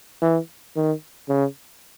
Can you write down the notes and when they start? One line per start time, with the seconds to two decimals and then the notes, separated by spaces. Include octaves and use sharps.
0.22 E3
0.76 D#3
1.29 C#3